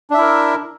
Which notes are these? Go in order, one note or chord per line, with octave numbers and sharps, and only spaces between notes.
D4 E4 A#4 E5